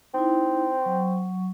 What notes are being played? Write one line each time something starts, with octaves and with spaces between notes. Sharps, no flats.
C4 D#4 E4
F#3 C#6